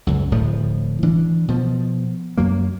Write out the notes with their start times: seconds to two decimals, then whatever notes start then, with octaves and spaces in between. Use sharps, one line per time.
0.07 C#2 F#2
0.31 D1 A2 F3
1.03 E3 D4
1.48 B2 F3
2.38 F#2 F#3 A#3